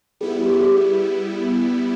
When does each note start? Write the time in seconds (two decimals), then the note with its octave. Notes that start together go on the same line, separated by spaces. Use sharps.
0.21 G3 B3 E4 G#4
0.41 G4
0.53 G#4
0.60 G4
0.67 G#4